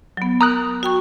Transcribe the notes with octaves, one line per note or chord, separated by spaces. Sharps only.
F#3 B3
A#4 A#5 D#6 F#6
F#4 G5 C#6